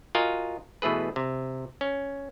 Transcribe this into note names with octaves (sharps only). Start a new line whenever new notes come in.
F4 F#4 A#4 D#5 F#5 G#5
B2 E3 A3 G#4 B4
C3
C#4